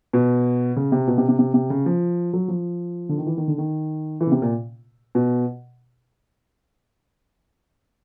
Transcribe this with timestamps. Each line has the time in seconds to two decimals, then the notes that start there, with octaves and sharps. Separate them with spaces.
0.13 B2
0.76 C#3
0.92 C3
1.07 B2
1.18 C3
1.29 C3
1.39 C3
1.54 C3
1.70 C#3
1.86 F3
2.33 F#3
2.48 F3
3.09 D3
3.18 D#3
3.27 E3
3.37 D#3
3.48 D3
3.58 D#3
4.21 E3
4.27 C#3
4.32 C3
4.42 A#2
5.15 B2